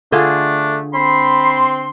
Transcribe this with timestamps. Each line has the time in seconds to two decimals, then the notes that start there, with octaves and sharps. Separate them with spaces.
0.12 D3 A3 D4 F4 G#4
0.94 C4 B5 C6